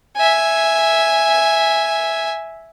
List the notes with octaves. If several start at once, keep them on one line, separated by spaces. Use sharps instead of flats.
E5 G#5